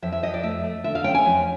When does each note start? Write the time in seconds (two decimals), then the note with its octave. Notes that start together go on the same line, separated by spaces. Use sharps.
0.02 F2 E5
0.12 E5
0.23 F2 D#5
0.34 D5
0.43 A3 E5
0.64 A3
0.84 D3 E5
0.95 F5
1.04 C#4 G5
1.15 G#5
1.25 F2